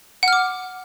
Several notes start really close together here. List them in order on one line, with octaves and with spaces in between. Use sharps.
F#5 F6 D6